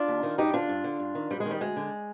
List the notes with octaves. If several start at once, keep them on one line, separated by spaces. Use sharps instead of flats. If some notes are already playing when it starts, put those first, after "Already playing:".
Already playing: D4 F4
D#2
D#3
G2 D#4 G4
D3 D4 F4
G2
D3
G2
D#3
G2 G3
G#3
D#3
G3
D2 G#3
D3